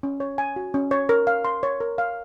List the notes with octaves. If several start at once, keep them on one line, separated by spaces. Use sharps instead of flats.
C#4
C#5
G#5
F#4
C#4
C#5
A#4
F5
C6
C#5
A#4
F5